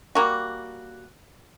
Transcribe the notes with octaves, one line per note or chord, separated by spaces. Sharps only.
G3 A#3 F#4